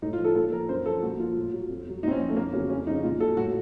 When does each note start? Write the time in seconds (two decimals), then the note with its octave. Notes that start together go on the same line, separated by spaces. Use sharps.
0.02 A2 D#4
0.13 F4
0.19 F3
0.24 A4
0.35 A#2 A4
0.52 F3 A#4
0.69 F#2 C5
0.86 F3 A4
1.02 A#2 F#4
1.19 F3 F4
1.36 A2
1.53 F#3
1.69 F2
1.86 C3 F#3
2.03 A#2 C4 D#4
2.11 C#4
2.19 F3 C4
2.29 A3
2.36 F2 A#3
2.53 C#3 F#3 C#4
2.70 F2 C#4
2.86 F3 D#4
2.90 C#3
3.04 A#2 F4
3.20 F#3 A4
3.37 A2 F#4